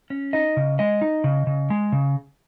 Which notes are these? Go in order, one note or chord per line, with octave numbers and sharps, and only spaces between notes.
C#4
D#4 D#5
C#3
G#3 D#5
D#4
C#3
C#3
G#3
C#3